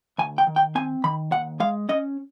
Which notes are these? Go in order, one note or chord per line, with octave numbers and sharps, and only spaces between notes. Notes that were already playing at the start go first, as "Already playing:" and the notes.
D2 G#5
G5
D#3
G5
C4 G#5
D#3 B5
D#2 F#5
G#3 F5
C#4 D#5